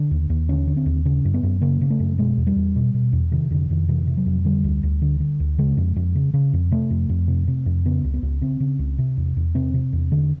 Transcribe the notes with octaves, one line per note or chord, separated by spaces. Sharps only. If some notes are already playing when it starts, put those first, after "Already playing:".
Already playing: D3 D4
D#2
D#2
D3 C#4
D3
C4
D#2
C#3 C#4
F#2
B3
F#2
C#3 A#3
C#3
A3
F#2
B2 G#3
E2
G3
E2
B2
B2
E2
C3 D#3
F2 D3
F2 D#3
C3 E3
C3
F#3
F2
D3 G3
D2
D2
D3
D3
D2
C#3 G#3
F2
F2
C#3
C#3
F2
C3 A3
F2
F2
C3
C3
F2
C#3 B3
C#2
B3
C#2
C#3 C4
C#3
C#2
C3
E2
E2
C3 C4
C3
E2
D3